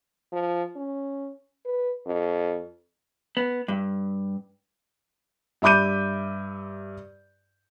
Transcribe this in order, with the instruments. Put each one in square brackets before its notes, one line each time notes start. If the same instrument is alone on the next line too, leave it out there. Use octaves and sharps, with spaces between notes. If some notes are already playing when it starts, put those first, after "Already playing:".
[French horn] F3
C#4
B4
F2
[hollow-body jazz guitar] B3
G2
[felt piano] G2 E5 B5 D6 G6 D#7